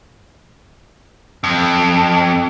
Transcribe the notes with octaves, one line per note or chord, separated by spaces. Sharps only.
F2